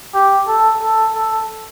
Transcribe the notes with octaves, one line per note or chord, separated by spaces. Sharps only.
G4
A4
A4
A4